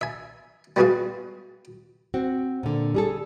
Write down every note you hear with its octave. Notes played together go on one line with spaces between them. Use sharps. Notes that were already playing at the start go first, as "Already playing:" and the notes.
E5 G#5
G3 G#3 B3 F#4 G#4 F5
C4 F#4
A#2 D3
G3 G#4 A4